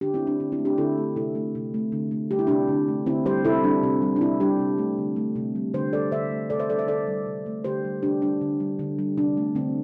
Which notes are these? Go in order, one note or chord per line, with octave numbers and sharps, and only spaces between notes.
D3 D4 G4
C4 E4
A3
D4
D3 D4
C4 E4
A3
D4 G4
D3 E4 A4
A3
C3 E4 A4
A3
C3
A3
D3
A3
G3 G4
E4
C3 D4 G4
D3
A3
D3 C4 E4
G3 G4 C5
C3 E4 A4
G3 D4
C3 C4
G3
D4
C3 C4 E4
G3 D4 G4
C3
A3
D3
A3
C3
G3
D3 G4 C5
G3 A4 D5
D3 C5 E5
A3
C3 A4 D5
C5 E5
G3 A4 D5
C5 E5
D3 A4 D5
G3
C3
A3
D3 G4 C5
G3
C3 D4 G4
G3 D4
D3
G3
D3
G3
C3 D4
A3
D3 C4